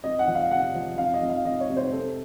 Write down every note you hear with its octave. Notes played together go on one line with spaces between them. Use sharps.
F2 D#5
F#5
F3
F5
C3 F#5
F3
F2 F5
D#5
F2
F5
F2 D#5
C#5
C3
C5
C4 A4